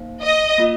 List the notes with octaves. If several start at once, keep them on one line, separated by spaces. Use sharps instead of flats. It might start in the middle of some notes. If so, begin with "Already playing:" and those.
Already playing: A#3 D#4 C5 F5
D#5
A#3 F4 D#5